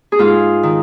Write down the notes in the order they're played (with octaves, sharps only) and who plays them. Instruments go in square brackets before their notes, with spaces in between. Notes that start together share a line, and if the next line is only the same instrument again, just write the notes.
[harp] G#4
G#2 F4
D#3